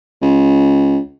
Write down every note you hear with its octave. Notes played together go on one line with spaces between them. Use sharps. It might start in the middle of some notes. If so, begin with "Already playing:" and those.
C#2